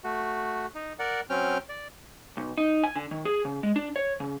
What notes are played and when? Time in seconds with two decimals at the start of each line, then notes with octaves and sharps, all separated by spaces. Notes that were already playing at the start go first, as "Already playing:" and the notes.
0.04 A3 F#4
0.75 D#4
0.99 A#4 D5 F#5
1.30 F#3 C4 C#4 G5 F6
1.69 D5
2.37 B1
2.58 D#4
2.84 G#5
2.96 D3
3.11 D#3
3.25 G#4
3.45 C#3
3.63 G#3
3.76 D4
3.96 C#5
4.20 C#3